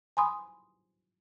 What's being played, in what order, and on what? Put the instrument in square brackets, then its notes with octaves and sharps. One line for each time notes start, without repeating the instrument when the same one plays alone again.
[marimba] G#5 B5 C6 D#6